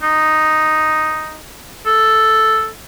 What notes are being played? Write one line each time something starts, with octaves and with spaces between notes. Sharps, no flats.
D#4
A4